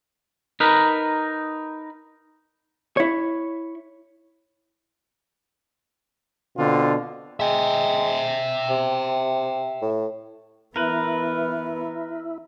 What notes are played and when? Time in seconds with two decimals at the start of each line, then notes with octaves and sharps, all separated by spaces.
0.60 D#4 A#4 B4
2.97 E4 C#5
6.56 B2 D3 C4 D4 F4
7.40 G#3 E5 G5
8.70 C3
9.82 A2
10.76 E3 B3 E4 A#4 B4